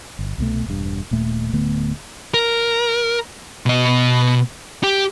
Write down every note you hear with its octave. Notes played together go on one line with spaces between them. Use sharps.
G1
C2 B2 A3
E1 G2
D#1 A#2 A3
D1 D3 A3 B3
A#4
B2 D#5
G4